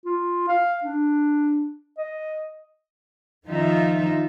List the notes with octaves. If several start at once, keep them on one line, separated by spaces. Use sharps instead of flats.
F4
F5
D4
D#5
D#3 F3 D#4 F4 E5